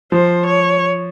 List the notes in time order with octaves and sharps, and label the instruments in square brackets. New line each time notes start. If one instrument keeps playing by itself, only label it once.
[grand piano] F3 [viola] C5
[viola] C#5